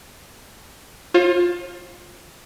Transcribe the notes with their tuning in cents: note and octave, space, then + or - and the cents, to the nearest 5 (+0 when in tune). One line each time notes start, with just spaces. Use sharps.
F4 +15 C5 +45